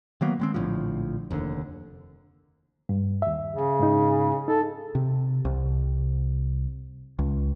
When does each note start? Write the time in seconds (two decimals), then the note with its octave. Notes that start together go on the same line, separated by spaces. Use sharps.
0.21 D#3 F#3 A#3 B3
0.39 D#3 G#3 C4
0.54 A#1 A2 D3 F3
1.31 F1 D#2 B2 D3
2.89 G2
3.22 D#2 E5
3.52 C#3
3.80 G#2 D#4
4.48 D#4 A4
4.95 C3
5.45 C2
7.19 C#2